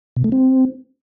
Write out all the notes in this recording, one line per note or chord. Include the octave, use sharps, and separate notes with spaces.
B2
A3
C4